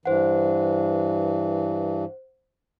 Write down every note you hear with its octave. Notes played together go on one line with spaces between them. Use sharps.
G2 E3 C5 F#5